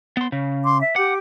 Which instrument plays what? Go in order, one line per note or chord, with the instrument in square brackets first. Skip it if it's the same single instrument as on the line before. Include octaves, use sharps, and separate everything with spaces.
[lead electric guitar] B3 C6
C#3
[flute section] C6 D6
E5
[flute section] G4 D6 [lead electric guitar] F#5